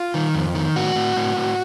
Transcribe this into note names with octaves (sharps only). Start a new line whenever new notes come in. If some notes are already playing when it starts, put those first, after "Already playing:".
Already playing: F4
D#3
F2
D#3
A2 F#4
A2
A2
A2